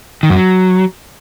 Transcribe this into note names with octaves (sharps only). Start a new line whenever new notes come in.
D#3
F#2
F#3